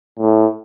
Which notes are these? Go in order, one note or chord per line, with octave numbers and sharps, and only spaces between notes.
A2